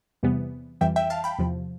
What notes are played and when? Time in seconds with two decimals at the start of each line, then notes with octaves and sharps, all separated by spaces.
0.23 E2 C3 E3 G3 B3
0.81 F2 E3 G3 E5 G5
0.96 E5 G5
1.10 F5 A5
1.24 G5 B5
1.39 E2 C3 F3